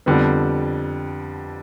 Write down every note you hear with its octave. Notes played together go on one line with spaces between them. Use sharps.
F2 D3 G3 B3